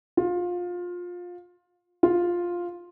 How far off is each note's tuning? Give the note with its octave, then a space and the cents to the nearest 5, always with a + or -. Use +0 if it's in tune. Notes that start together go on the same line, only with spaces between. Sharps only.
F4 +20
F4 +5